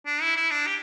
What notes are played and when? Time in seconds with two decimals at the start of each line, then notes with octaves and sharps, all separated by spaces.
0.06 D4
0.22 E4
0.37 E4
0.51 D4
0.67 G4